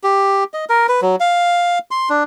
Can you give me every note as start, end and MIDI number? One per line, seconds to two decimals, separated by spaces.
0.03 0.44 67
0.54 0.65 75
0.69 0.87 70
0.89 1.01 71
1.02 1.16 54
1.20 1.79 77
1.91 2.09 84
2.09 2.23 62